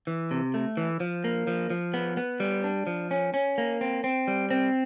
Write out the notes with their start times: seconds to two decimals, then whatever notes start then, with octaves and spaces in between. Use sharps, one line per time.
0.07 E3
0.31 C3
0.54 A3
0.77 E3
1.00 F3
1.24 A#3
1.47 F3
1.70 F3
1.94 B3
2.17 B3
2.40 G3
2.64 D4
2.87 F3
3.11 C#4
3.34 C#4
3.58 A#3
3.81 C4
4.04 C4
4.28 G3
4.51 C4